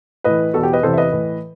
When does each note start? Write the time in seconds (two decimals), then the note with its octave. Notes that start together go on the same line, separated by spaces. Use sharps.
0.24 A2 E3 B4 D#5
0.54 E2 B2 F#4 A4
0.63 G4
0.73 B4 D#5
0.83 E2 C3 E3 A4 C5
0.93 E5
0.97 B4 D#5
1.12 A2 E3